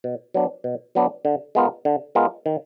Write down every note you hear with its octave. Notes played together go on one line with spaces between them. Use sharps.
B2
F#3 B3 D4
B2
F#3 B3 D4
D3
G#3 B3 F4 A#4
D3
G#3 B3 F4 A#4
D#3